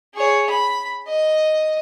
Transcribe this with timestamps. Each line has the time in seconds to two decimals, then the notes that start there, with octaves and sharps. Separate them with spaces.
0.15 G#4 C#5
0.50 B5
1.08 D#5